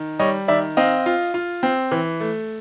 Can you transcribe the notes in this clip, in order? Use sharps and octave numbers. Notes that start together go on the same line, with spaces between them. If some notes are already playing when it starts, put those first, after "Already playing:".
Already playing: D#3
G3 C#5 D#5
D#3 D5 E5
C4 D#5 F5
F4
F4
C4
E3
A3